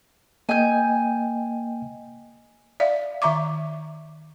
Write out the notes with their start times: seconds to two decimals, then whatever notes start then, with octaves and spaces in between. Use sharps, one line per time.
0.49 A#3 D#5 G5 G#5 G6
2.80 D5 E5 F5
3.22 D#3 E5 A#5 C#6 D6